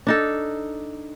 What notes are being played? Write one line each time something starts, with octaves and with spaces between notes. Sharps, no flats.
D4 D#4 A4